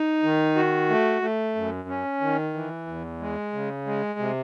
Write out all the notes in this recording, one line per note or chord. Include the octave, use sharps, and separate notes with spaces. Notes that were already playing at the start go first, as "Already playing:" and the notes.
Already playing: D#4
D#3
F#4
A3
A3
F#2
C#4
D#3
E3
E2
G#3
C#3
G#3
C3